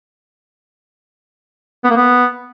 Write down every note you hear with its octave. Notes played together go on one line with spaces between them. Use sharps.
B3
A#3
B3